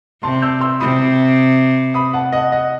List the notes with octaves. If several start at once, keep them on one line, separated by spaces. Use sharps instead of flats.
C3 A5 C6
E6 G6
C6 E6
C3 B5 D#6
B5 D#6
F#5 A5
D#5 F#5
D#5 F#5